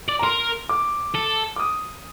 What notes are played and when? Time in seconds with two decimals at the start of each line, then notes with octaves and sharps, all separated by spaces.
0.09 D5
0.19 A#5
0.23 A#4 C6
0.69 D6
1.14 A4
1.56 D6
1.60 D#6